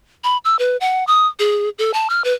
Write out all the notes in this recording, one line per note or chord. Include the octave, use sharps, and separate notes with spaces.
B5
E6
B4
F#5
D#6
G#4
A4
A5
F6
B4